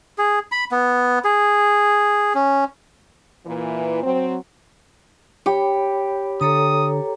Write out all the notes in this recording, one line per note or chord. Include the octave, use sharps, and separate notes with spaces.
G#4
B5
B3
G#4
C#4
A#2 E3
F#3 C4
G4 C#5 B5
D3 A4 C#5 A#5 D#6